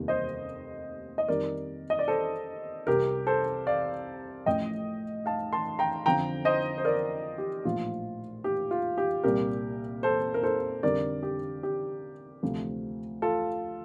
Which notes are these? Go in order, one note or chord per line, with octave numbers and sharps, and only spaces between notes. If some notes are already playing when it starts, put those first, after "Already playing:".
Already playing: F1 D#2 D#3 G3
C5 D#5
D#5
F2 D#3 G3 A#4 D5
D#5
D5
A4 C5
C2 C3 G3 G4 A#4
A4 C5
D5 F5
A1 A2 F3 D#5 G5
F5 A5
A5 C6
G5 A#5
F2 D3 F3 G5 A#5
C5 D#5
C5
A#4 D5
G4
A#1 A2 F3 F4
G4
F4
G4
C2 A#2 G3 G4 A#4
A4 C5
A#4
A4 C5
F2 D3 G3 A#4 D5
G4
G4
D2 C3 F3
F4 A4